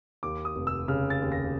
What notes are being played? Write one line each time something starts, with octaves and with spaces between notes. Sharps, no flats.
D#2 D6
D#6
F1
E6
C#3 F6
A6
D#2
A#6